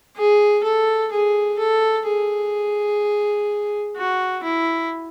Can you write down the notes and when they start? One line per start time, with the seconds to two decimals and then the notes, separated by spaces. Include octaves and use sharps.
0.17 G#4
0.64 A4
1.12 G#4
1.59 A4
2.07 G#4
3.97 F#4
4.43 E4